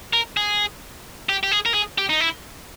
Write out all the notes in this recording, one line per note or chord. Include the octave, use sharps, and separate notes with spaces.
A#4
G#4
G4
G4
G#4
A#4
G#4
G4
D#4
E4